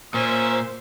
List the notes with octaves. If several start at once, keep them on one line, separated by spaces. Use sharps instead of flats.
A#2 C#4 C5 E5